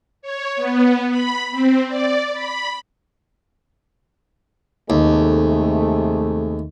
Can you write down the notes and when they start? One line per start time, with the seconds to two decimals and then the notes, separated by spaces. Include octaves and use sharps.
0.22 C#5
0.56 B3
1.10 B5
1.52 C4
1.88 D5
2.33 B5
4.90 D#2 C3 G#3 A3